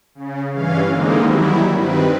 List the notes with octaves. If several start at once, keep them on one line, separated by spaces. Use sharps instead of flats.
C#3
G2 E3 C#4 F5
D3 E3 G#3 A#3 C4 D#4
D#3 F#3 G3 E4
G2 D#3 C4 B4